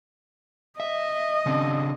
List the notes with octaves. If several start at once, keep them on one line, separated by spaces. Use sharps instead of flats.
D#5 E5
C#3 C4 D4